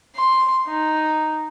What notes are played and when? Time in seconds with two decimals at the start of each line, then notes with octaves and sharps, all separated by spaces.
0.16 C6
0.68 D#4